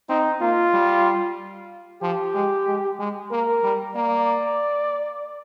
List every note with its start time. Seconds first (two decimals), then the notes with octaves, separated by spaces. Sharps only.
0.09 C4 D#4
0.41 A#3 F4
0.74 G3
2.02 F3 G4
2.35 G#3
2.67 G#3
2.99 G#3
3.31 A#3 A#4
3.63 G3
3.95 A#3 D5